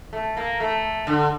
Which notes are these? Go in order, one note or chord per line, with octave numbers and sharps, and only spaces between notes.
A3
A#3
A3
D3